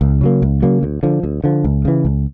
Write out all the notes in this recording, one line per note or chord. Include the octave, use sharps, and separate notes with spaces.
C#2
C#3 F#3 A#3
C#2
C#3 F#3 A#3
D2
D3 F3
D2
D3 F3
C#2
C#3 E3
C#2